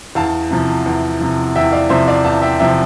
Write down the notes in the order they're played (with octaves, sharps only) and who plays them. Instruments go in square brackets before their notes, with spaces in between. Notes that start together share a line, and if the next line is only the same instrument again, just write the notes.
[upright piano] E2 F5 A5
C3 F3
E2
C3 F3
E2 E5 G5
D5 F5
C3 F3 C5 E5
D5 F5
E2 F5 A5
E5 G5
C3 F3 E5 G5